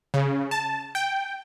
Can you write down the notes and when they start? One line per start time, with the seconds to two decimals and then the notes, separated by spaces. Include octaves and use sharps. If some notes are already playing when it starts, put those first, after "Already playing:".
0.14 C#3
0.51 A5
0.95 G5